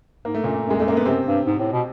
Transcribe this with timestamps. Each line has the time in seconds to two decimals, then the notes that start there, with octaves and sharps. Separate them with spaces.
0.25 G#2 A#3
0.35 A3
0.44 F#2 A#2 A#3
0.66 F#2 G#3
0.79 F2 A3
0.85 F#2 A#3
0.97 B3
1.06 F#2 C3 C4
1.26 G2
1.46 G#2
1.59 A2
1.73 B2